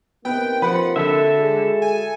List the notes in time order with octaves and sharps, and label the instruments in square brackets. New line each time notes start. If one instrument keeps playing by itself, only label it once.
[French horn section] C3 A#3 D#4 [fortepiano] B3 [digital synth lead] G5
[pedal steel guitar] F3 [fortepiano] B4 [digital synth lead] F#5
[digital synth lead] D3 [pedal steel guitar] A4 E5
[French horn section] G#3 F#4 G#4
[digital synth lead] G#5